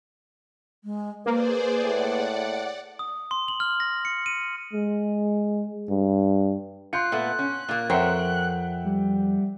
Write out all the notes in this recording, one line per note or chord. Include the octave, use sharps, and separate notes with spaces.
G#3
A#3 G#4 B4 C5 D5
A2 D5 F#5
D#6
C6
F#7
F6
A#6
C#7
D#7
G#3
G2
F4 C6 F#6 G6 C#7
A#2 A3 B3
C#4
A#2 A#3
F2 A#4 C5 C#5 E5 F#5 G5
G3